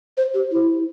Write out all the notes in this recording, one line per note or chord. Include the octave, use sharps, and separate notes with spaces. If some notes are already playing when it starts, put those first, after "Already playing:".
C5
G4
E4